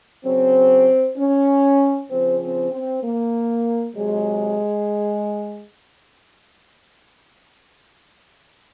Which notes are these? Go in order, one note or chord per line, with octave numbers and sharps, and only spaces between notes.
C#3 F#3 C4
C#4
C#3 F3 C4
C4
C4
A#3
C3 F#3 G#3